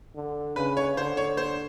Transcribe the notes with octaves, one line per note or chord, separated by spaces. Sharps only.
D3
C#3 B4
C#5
D3 C5
C#5
C5